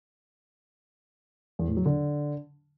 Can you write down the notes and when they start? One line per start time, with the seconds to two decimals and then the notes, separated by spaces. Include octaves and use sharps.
1.59 E2
1.68 A2
1.77 F#3
1.85 D3